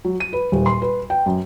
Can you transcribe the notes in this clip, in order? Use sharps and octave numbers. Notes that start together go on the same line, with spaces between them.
F#3
D#7
B4
D#1
C6
B4
G5
F#2